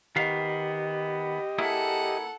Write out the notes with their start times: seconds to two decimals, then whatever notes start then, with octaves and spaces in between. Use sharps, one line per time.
0.16 D#3 B3 G4 D#5 F5
1.58 A#3 E4 G#4 A4 F#5